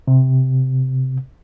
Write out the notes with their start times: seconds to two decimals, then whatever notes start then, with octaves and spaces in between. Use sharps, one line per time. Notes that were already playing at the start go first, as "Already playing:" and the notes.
0.08 C3